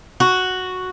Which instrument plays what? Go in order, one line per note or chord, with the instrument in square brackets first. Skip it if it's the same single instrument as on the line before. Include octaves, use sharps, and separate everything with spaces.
[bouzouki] F#4